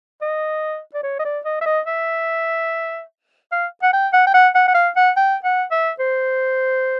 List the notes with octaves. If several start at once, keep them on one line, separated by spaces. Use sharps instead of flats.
D#5
D5
C#5
D#5
D5
D#5
E5
D#5
E5
F5
F#5
G5
F#5
G5
F#5
F#5
F#5
F5
F#5
G5
F#5
E5
C5